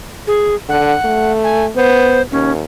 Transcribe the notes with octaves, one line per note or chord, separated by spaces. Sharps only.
G#4
D3 F#5
A3
G#5
B3 C5
D#2 C#4